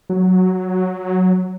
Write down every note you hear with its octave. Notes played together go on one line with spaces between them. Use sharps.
F#3